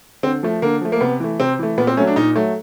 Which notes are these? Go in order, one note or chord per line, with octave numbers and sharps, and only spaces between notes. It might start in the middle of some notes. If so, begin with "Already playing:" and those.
D3 C4
F3 A3
D3 A#3
F3 A3
A#3
C3 B3
E3 A3
C3 C4
E3 A3
A#2 B3
C4
F#3 A3 C#4
D4
A#2 D#4
F#3 A3